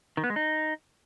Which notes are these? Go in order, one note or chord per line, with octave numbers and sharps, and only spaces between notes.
D#3
B3
G#3
D#4